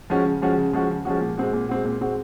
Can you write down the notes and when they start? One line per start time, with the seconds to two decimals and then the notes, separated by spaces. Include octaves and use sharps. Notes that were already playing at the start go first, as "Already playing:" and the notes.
0.10 F3 G#3 C#4 F#4
0.26 C#3
0.42 F3 G#3 C#4 F#4
0.57 C#3
0.73 F3 G#3 C#4 F#4
0.89 C#3
1.05 F3 G#3 C#4 F#4
1.21 A#2
1.38 G#3 C4 F#4
1.53 A#2
1.69 G#3 C4 F#4
1.85 A#2
2.01 G#3 C4 F#4